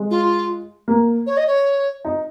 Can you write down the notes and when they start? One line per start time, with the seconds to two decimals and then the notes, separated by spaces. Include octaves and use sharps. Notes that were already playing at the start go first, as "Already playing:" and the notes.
Already playing: G#3
0.11 F4
0.88 A#3
1.27 C#5
1.37 D#5
1.47 C#5
2.05 D#4